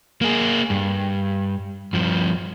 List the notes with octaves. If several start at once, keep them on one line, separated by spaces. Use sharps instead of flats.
A#3 G#4
G2
G2 F3